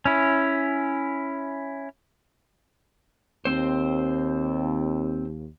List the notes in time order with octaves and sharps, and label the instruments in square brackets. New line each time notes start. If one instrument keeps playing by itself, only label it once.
[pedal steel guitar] C#4 E4
[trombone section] D#2 [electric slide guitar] C4 C5